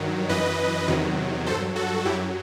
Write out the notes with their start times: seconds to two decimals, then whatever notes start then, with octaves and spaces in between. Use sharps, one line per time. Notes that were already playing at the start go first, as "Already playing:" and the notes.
Already playing: G2 D#3 F#3
0.29 F#2 E3 B4 D#5
0.88 E2 C3 D#3 F#3
1.46 G2 F#3 A4 C5
1.76 F#4 A4
2.05 F#2 F#3 E4 G4